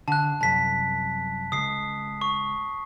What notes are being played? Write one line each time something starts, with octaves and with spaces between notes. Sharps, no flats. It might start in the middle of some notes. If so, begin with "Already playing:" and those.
D3 A5 F#6
C2 F#2 A5 B6
C#2 D#6 C7
C#6